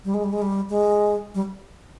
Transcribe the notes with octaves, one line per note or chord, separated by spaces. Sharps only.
G3
G#3
G3
G#3
G3
G#3
G3